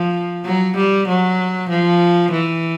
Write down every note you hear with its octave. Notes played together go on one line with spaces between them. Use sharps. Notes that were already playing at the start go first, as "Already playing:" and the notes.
Already playing: F3
F#3
G3
F#3
F3
E3